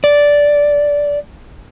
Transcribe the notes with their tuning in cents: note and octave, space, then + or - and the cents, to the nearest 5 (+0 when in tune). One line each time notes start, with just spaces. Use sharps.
D5 -10